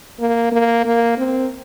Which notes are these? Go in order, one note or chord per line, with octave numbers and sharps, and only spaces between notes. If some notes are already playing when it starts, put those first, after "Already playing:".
A#3
A#3
A#3
C4